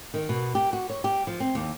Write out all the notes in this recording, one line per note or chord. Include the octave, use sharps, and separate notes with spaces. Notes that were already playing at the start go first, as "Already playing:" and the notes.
D#3
B2
G4
F#4
C#5
G4
F3
C4
D#2